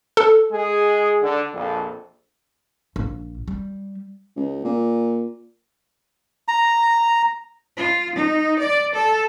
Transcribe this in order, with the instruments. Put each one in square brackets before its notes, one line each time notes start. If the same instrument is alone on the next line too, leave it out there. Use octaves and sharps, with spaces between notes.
[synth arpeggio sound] A4
[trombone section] G#3 G#4
D3
A#1 F2
[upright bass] A#1
G3
[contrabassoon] C#2
A#2
[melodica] A#5
[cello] F4
D#4
D5
A4